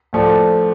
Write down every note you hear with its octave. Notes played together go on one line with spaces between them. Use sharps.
A2 F3 A3 D4